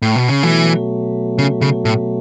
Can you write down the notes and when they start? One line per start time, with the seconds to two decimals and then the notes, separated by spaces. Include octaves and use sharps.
0.02 A2
0.16 B2
0.29 C#3
0.43 B2 E3 F#3 A3
1.38 C#3
1.61 C#3
1.85 A2